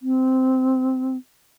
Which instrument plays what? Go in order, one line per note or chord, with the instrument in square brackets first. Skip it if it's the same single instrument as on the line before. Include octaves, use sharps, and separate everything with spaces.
[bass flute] C4